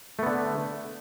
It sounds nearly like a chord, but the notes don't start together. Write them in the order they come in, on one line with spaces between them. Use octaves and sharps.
A3 B3 D3